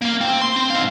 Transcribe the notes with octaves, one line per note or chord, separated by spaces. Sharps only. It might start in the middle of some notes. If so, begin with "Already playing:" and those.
A#3 F5
C4
C6
C4
G#2 F5